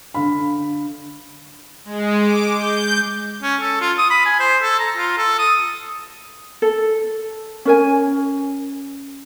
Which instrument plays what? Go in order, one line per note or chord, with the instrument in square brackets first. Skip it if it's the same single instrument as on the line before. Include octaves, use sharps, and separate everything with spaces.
[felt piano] D3 F5 B5
[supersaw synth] G#3
D6
G6
[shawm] C#4
A4
F4
D#6
B5
G#5
C5
A4
A#5
F4
A4
D#6
[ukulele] A4
C#4 A#4 G#5